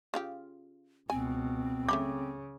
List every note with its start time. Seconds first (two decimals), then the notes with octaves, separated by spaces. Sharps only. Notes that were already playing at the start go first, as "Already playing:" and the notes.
0.14 C#3 F4 G4
1.10 C#2 B2 C4 G#5
1.89 C#3 A3 C#4 B5 D6